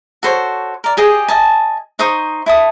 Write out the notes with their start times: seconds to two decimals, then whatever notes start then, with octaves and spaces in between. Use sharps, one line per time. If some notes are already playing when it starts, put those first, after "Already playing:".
0.23 F#4 A4 C5 C#5
0.84 A#4 D5
0.97 G4 G#4 D#5 G5
1.28 D#5 G#5 A5
1.99 D#4 C5 C#6 D#6
2.46 E4 A5 D#6